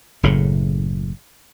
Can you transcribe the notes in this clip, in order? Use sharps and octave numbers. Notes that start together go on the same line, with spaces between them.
F#1 A2 C#3